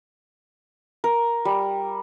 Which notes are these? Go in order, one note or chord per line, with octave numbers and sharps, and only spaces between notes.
A#4
G3